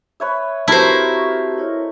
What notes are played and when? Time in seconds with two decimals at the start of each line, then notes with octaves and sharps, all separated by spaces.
0.20 B4 C#5 E5
0.68 A3 C4 E4 F#4 G4 A#4 C5
1.58 E4 C#5 D#5